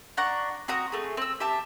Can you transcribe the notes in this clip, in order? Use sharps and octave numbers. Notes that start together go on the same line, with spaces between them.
D4 F#5 A#5 C#6
C4 F#4 A#5 D#6
A3 G#4
C4 E6
G4 E5 A5